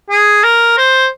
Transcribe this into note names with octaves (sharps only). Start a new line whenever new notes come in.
G#4
A#4
C5